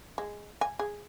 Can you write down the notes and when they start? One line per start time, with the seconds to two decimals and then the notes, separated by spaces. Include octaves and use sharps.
0.18 G#3
0.61 G#5
0.79 G#4